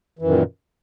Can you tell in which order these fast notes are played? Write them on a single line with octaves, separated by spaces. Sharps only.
E3 F#2 D#3 A#2